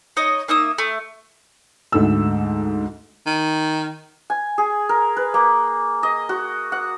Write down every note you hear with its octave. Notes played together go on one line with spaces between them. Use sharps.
D#4 C#5 D#5
A#3 D#4 E5 D#6
A3
D2 G#2 A3 A4 E6
D#3
G#5
G#4
A#4
B4
A#3
D#5
F#4
F#5